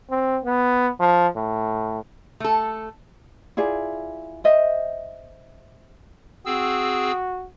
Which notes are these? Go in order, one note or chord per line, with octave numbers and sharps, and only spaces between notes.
C4
B3
F3
A2
A3 A4
E4 F4 G#4 D5
C5 D#5 E5
C4 F#4 G#4 E6